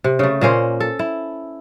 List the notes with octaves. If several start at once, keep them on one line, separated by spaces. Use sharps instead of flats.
C3
C#3 A3
A#2 A#3 C#4 C5
A4
E4